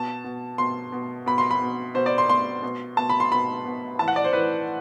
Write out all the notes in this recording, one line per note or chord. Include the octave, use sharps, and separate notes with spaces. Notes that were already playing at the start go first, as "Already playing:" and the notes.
Already playing: B2 A5
B2
B2 C6
B2
B2 B5
C6
B5
B2
B2 C5
D5
C6
B2 C6
B2
B2 A5
B5
C6
B2 B5
B2
A2 E3 A5
F#5
D5
C5
A2 E3 B4